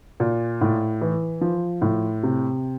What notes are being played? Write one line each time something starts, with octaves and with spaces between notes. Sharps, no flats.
A#2
A2
E3
F3
A2
C3